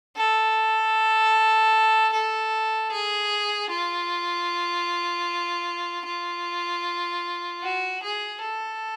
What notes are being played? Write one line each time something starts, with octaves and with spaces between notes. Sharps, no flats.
A4
A4
G#4
F4
F4
F#4
G#4
A4